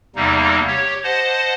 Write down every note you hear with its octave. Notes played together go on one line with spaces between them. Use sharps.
E2 C3 G3 A#3 D#4
G4 C#5
C5 D#5 F#5 A5